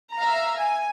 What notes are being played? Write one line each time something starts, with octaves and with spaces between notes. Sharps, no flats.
E5 F5 A#5
G#5